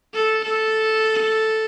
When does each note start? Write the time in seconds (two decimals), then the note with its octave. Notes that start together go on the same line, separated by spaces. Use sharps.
0.14 A4
0.44 A4